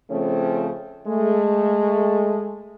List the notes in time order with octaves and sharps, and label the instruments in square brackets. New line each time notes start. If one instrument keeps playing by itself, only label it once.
[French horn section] C#3 F3 A3 C4 C#4
G#3 A3